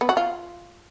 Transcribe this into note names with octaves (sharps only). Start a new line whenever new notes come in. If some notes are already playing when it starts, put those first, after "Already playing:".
B3
F#4
F4